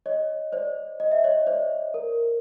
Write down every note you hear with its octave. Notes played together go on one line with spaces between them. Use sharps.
C#5 D#5
C5 D5
D#5
E5
C#5 D#5
C5 D5
A#4